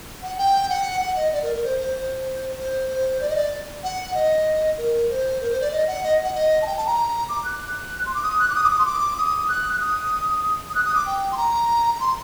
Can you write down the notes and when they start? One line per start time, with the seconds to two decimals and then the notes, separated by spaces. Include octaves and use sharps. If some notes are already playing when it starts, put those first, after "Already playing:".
0.23 F#5
0.38 G5
0.69 F#5
1.01 F#5
1.16 D#5
1.32 D5
1.43 A#4
1.53 A#4
1.64 C5
1.79 C5
1.95 C5
2.57 C5
2.90 C5
3.20 D5
3.29 D#5
3.36 D5
3.83 F#5
4.14 D#5
4.78 A#4
5.10 C5
5.41 A#4
5.51 C5
5.61 D5
5.72 D#5
5.87 F#5
6.03 D#5
6.24 F#5
6.35 D#5
6.62 A5
6.67 G5
6.77 A5
6.87 A#5
7.29 D6
7.45 F#6
8.06 C6
8.15 D6
8.23 D#6
8.39 F#6
8.50 D6
8.55 D#6
8.64 D6
8.71 D#6
8.79 C6
8.86 D6
9.18 D#6
9.49 F#6
9.73 F#6
9.80 D#6
10.69 D#6
10.75 F#6
10.85 D#6
10.95 D6
11.06 G5
11.32 C6
11.37 A#5
11.94 A#5
12.00 C6